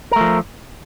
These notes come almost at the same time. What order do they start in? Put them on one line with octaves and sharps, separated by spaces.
A#4 A3 F3